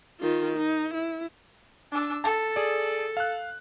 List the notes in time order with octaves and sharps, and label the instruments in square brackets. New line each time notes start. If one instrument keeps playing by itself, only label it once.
[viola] D#3 F4
D#4
E4
[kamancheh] D4 E6
[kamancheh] A4 [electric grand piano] A5
[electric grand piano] G#4 D5
F5 F#6